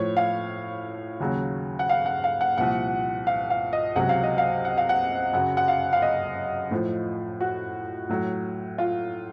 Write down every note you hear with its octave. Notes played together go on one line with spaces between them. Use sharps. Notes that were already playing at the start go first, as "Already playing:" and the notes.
Already playing: A2 F3 C#5
F5
D#2 C#3 F#3
F#5
F5
F#5
F5
F#5
C2 A#2 F3 F#5
F5
F5
D#5
C#2 C3 F#3 F#5
F5
D#5
F5
F#5
F5
F#5
F#2 C#3 F#3 F#5
F#5
F5
F5
D#5
A2 F3
F#4
A2 F#3
F4